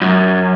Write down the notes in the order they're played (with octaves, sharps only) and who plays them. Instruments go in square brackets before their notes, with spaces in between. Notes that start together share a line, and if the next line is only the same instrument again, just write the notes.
[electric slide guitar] F#2